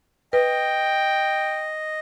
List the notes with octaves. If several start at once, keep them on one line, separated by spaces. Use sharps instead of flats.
B4 D#5 G5